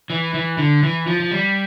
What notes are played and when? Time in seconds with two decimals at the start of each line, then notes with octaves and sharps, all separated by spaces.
0.10 E3
0.34 E3
0.58 D3
0.83 E3
1.07 F3
1.20 F3
1.31 G3